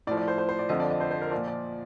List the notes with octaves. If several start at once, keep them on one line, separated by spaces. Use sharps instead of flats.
A2 F3 D5
D5
C5
C5
C5
D5
F2 D3 F3 D#5
D5
D#5
C5
C5
A#4
A#2 F3 D5
D5